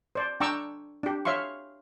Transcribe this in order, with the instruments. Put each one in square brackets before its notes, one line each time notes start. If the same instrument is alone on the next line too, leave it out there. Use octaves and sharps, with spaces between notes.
[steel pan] C5 D5
D4 G5 A#5 C#6 D6 E6
D4 G4
C#5 E5 F5 C6 C#6